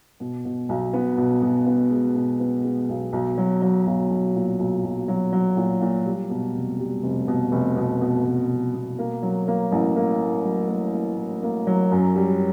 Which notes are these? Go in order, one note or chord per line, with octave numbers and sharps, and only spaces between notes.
B2
B2
B1
B3
B2
B2
B3
G#3
B2
B3
G#3
B1
B1
F#3
F#3
B1
B1
A#2
B1
B1
F#3
F#3
A#2
A#2
G3
B2
F1
G3
F1
B2
F1
B2
B2
F1
F1
B2
A#3
F#3
A#3
A1
A#3
A2
F#3
A#3
A#3
A2
A#3
F#3
F#2
G3